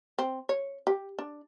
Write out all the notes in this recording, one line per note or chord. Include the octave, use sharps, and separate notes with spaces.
C4
C#5
G4
D4